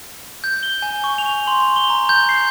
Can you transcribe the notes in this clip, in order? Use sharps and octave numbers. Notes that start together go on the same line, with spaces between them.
G6
G7
G#5
C#6
F7
C6
G7
A#5
G6
C7